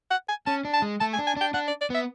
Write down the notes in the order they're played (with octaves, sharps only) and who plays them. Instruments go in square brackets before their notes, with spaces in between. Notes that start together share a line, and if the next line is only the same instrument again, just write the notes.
[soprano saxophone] F#5
G#5
[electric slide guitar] C#4 [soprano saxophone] A5
[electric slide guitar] D4
[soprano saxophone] A5
[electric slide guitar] G#3
[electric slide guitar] A3 [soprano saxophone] A5
[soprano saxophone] G#5
[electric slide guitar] D4
[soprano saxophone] G#5
[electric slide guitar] D4 [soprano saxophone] G5
[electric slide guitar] D4 [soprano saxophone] F#5
[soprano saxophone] D5
D5
[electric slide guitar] B3 [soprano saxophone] E5